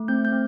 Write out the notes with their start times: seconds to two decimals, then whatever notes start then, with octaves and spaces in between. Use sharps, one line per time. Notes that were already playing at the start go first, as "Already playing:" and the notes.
Already playing: A3
0.08 C4 G6
0.25 G6
0.32 C4